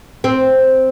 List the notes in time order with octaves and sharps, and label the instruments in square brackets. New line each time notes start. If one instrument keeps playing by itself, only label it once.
[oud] C4